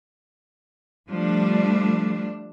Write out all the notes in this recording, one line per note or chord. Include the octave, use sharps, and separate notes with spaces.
F3 G3 A3 D4